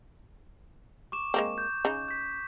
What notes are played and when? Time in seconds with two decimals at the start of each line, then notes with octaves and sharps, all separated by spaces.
1.12 C#6 D6 E7
1.34 G#3 A#3 C4
1.58 G6
1.85 C#3 D#4
2.09 G6 B6